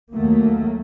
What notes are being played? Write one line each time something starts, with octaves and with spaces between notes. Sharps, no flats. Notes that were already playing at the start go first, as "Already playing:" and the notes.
D#2 D#3 F#3 A3 A#3